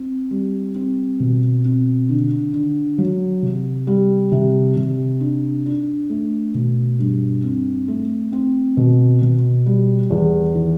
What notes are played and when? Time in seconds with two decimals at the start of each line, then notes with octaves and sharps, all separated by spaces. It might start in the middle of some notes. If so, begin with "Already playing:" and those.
Already playing: C4
0.31 G3
0.75 C4
1.20 B2
1.65 C4
2.09 D3
2.53 D3
2.98 F#3
3.42 C3
3.87 G3
4.32 C3
4.76 C3
5.20 D4
5.66 D4
6.10 A3
6.54 B2
6.99 G2
7.43 C4
7.88 A3
8.32 C4
8.77 B2
9.22 B2
9.66 G3
10.10 E2
10.55 E3